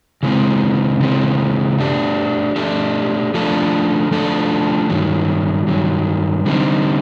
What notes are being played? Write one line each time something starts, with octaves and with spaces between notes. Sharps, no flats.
C#3 E3 G#3 C4
C#3 E3 G#3 C4
A3 D4 G4
A3 D4 G4
F3 A3 D4 F4 A4
F3 A3 D4 F4 A4
G2 D#3 F#3
G2 D#3 F#3
D3 G3 C4 D#4